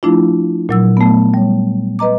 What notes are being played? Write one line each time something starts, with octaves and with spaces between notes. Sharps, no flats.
F3 A3 D4 E4 F4
A#2 F#3 E6
A3 B3
G3 C#5
B4 D#5 A#5 D6